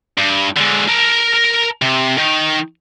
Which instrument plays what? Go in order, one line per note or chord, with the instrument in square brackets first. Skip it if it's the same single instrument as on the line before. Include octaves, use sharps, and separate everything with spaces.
[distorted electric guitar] G2
G#2 D3
A#4 A5
C3
D#3